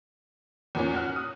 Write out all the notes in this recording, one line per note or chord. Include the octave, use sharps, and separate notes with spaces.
E2 A#2 C#4
F#4 F6 F#6
D#6